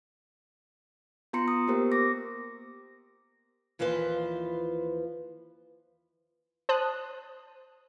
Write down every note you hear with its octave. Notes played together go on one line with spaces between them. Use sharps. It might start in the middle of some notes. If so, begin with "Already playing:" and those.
B3 F4 A#5 C6 C#7
D#6
A#3 B3 G4 A#4 C5
D6 A#6
D#2 E3 F3 F4 B4 C5
C5 A5 D#6 F#6